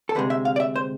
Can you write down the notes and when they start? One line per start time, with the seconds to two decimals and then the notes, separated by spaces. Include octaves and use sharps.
0.09 A4
0.15 D2 C3 G#3 B4
0.30 E5
0.45 F5
0.56 D5
0.60 E5
0.76 C5